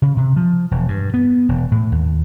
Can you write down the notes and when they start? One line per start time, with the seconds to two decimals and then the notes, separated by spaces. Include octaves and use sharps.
0.02 C#3
0.17 C3
0.37 F3
0.71 E1
0.88 G2
1.14 B3
1.49 E1
1.72 A2
1.92 D#2